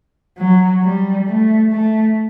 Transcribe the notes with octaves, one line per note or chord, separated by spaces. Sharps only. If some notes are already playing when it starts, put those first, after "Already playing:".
F#3
G3
A3
A3